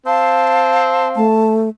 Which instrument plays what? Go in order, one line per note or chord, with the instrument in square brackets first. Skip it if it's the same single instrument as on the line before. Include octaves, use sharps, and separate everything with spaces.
[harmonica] C4 [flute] F5 [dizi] A5
[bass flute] A3 [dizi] A5